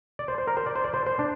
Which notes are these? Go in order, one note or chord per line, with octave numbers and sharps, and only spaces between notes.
D5
C5
C5
A#4
C5
D5
C5
D5
C5
C5
D4